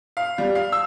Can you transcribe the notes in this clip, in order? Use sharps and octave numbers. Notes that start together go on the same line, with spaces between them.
F5
G3
F5
E6